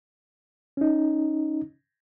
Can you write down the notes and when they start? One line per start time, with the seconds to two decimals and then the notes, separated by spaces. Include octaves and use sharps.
0.77 C#4 D#4